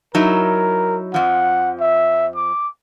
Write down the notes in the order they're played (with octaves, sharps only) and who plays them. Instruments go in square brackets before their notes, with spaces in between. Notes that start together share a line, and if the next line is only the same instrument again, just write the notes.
[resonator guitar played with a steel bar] F#3 D#4 E4 [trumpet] A#4
[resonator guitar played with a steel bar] F2 F3 [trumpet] F#5
[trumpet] E5
D6